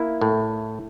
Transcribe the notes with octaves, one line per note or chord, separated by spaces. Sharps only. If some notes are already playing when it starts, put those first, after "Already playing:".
Already playing: A#3 E4
A2